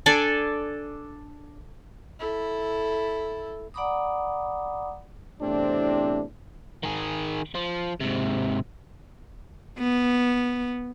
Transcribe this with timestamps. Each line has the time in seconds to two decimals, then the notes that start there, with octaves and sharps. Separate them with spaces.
0.06 D4 A4 D5 G#5
2.19 E4 A4
3.74 D5 F#5 A#5 B5 D6 D#6
5.41 E2 A2 C3 C4 D4
6.83 D#3 G#4
7.55 F3
8.00 G#2 C3
9.78 B3